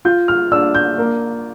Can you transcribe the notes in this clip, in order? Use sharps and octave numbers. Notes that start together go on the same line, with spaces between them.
F4 G6
F6
D4 E6
G6
A#3